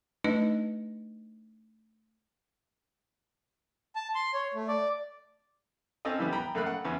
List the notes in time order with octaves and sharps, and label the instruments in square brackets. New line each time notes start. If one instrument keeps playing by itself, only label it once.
[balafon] A3 D4 D#4 B4 D#5
[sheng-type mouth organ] A5
C6
C#5
A3
D5
[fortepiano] C4 C#4 A4 D#5
E3 G3 B3
G5 A#5 B5
F#2 A3 A#3 F5 B5 F#6
F#5
E2 B3 C#4